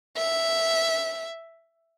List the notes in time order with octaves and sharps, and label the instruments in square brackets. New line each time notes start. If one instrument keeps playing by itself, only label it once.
[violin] E5